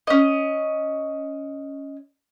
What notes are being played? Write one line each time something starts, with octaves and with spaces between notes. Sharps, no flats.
C#4 D#5